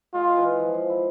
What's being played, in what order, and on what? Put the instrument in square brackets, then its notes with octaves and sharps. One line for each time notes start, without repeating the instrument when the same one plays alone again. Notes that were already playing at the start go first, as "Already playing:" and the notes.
[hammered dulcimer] G#3 [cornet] F4
[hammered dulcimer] E3
F3
F3
E4